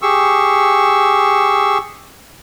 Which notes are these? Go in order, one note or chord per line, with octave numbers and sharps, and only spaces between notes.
G4 G#4 C#6 E6